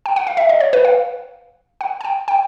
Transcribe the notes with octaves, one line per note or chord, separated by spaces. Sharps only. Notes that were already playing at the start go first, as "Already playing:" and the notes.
G5
F#5
F5
E5
D#5
C#5
B4
F5
F#5
G#5
G5
G5